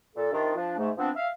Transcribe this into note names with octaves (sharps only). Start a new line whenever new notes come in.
A#2 A4
C3 D#3 D4 F4
F3 D4
G#2 A3
F3 B3 C4 D4
E5 F5